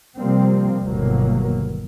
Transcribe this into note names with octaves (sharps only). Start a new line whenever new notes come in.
C3 F3 G3 A#3 C4
G1 D#2 B2 F#3 A#3